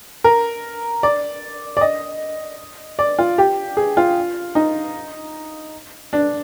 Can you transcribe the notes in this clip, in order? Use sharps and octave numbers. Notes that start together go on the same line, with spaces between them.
A#4
D5
D5
D#5
D5
F4
G4
G#4
F4
D#4
D4